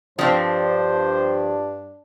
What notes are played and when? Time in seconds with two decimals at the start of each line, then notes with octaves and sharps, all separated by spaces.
0.19 G2 F3 C4 D4 C5